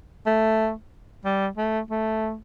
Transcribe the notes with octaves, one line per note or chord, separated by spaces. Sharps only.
A3
G3
A3
A3